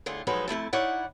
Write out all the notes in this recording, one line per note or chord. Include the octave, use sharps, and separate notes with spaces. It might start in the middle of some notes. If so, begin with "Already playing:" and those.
A2 D3 F4 G#4
F3 F#3 G#3 D#4 A4 B4
F2 A3 E4 A5
D#4 E4 C#5 D5 F#5